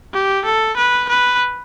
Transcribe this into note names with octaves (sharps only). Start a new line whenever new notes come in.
G4
A4
B4
B4